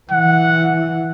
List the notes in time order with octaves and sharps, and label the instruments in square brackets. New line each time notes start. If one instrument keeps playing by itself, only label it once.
[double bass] E3 [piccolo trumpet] F#5